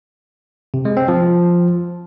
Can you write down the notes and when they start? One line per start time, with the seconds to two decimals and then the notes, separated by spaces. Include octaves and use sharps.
0.74 C3
0.85 G#3
0.97 C4
1.08 F3